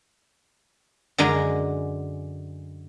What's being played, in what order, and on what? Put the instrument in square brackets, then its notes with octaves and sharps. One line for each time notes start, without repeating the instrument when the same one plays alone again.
[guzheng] F#2 D3 G#3 A#5